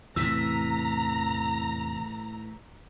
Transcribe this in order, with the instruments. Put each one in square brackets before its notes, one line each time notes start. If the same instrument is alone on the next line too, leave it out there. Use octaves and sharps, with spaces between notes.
[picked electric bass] E2 C3 [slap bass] A2 E3 [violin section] A#5 [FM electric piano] E6 B6